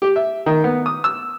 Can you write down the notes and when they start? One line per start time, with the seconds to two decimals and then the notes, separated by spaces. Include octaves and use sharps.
0.02 G4
0.16 E5
0.46 D#3
0.64 B3
0.86 D#6
1.04 E6